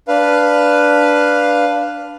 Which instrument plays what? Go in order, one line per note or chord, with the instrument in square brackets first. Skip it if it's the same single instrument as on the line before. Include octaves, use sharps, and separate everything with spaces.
[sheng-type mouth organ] D4 B4 F5